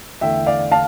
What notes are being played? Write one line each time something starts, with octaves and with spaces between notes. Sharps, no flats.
E2 D3 A3 E5 G5
D5 F5
F5 A5